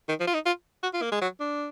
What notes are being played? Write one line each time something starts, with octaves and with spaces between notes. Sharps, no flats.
D#3
F3
F4
D#4
F4
F#4
F4
A#3
G#3
F#3
D4